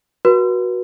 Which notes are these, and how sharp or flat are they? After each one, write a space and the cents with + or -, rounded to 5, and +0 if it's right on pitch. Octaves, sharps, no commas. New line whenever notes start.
F#4 +0 B4 -35